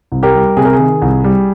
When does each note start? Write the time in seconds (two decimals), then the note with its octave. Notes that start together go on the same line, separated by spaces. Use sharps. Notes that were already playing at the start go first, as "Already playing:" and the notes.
0.12 C2
0.23 G4 A#4
0.35 G3
0.57 C3 G#4
0.65 A#4
0.73 G#4
0.79 D#3
1.02 C2
1.24 G3